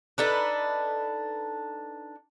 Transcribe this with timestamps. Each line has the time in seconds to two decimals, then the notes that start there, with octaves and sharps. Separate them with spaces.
0.18 D4 D#4 A4 B4